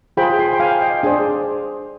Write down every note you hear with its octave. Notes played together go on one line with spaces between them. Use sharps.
F4 G#4 C5 G5 B5
G#5 C6
G5
F5 G#5
D#5 G5
D4 G#4 C5